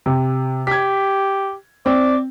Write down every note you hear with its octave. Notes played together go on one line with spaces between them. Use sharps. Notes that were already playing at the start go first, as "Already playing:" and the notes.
C3
G4 G#6 B6
C4 D5